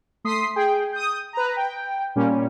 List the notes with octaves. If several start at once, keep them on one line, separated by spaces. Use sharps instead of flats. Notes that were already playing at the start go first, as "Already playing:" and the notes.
A3 C6 D#6 B6 C7
G#4 G5
D#6 G6
B4 A#5
G5
A#2 G3 A#3 C#4